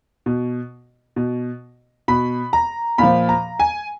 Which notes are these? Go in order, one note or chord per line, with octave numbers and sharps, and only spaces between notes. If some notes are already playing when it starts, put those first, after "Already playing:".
B2
B2
B2 B5
A#5
A#2 F3 B5
A#5
G#5